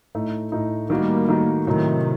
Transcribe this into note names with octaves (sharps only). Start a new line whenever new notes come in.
A2 A3 D#4
A2 A3 D#4
D#3 G3 A3 A#3 D#4 F#4
D#3 A3 D#4 F#4
A2 C3 D#3 F#3 A3 D#4